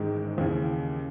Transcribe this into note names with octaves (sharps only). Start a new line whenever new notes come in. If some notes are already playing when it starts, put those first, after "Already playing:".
Already playing: A1 G#2 D#3 G#3
D#2 C#3 E3